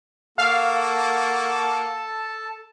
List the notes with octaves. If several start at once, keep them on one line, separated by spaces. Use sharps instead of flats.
A#3 F#4 A4 F5 A5